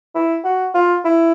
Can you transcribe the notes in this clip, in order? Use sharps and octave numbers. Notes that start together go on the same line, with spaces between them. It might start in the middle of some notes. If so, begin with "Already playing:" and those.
E4
F#4
F4
E4